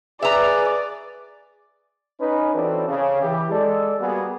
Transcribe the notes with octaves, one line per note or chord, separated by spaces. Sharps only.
G#4 B4 D5 E5 A#5
C#4 D#4 B4
E3 C4 C#4 F#4 A4 D5
C#3
E3 G4
G#3 A4 D5
G3 A#3 B3 F#4 G#4